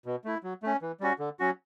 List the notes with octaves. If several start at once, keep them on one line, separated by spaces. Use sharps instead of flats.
B2
A3 E4
F#3
A3 C#4
E3
G3 C#4 F#4
D3
F#3 C#4 F#4